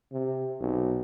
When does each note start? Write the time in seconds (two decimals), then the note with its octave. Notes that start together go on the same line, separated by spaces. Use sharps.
0.12 C3
0.60 B1